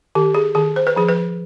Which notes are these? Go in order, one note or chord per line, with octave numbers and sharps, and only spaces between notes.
D#3 G4
G#4
D#3 G#4
C5
B4
F3 G#4
B4